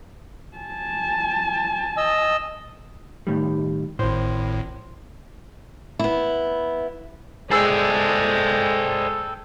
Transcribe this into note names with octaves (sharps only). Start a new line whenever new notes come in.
G#5 A5
D#5 E6
A2 D#3 G3
G#1 A2 C5
B3 E4
G#3 G#4 A4 C5 D5 G5 E6